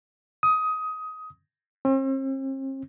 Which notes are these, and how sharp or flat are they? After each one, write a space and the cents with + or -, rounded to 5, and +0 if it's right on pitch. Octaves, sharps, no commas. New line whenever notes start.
D#6 +20
C4 +45